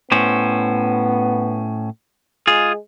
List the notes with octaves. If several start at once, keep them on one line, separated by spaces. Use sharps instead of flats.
A2 B3 C#4 C5
G#3 F4 G#4